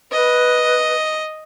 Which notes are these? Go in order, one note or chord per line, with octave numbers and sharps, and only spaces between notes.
B4 D#5